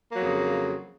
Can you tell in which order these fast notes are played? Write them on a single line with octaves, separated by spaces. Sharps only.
A#3 F#3 F2 C#3